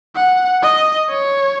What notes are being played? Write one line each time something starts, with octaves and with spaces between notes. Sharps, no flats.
F#5
D#5
C#5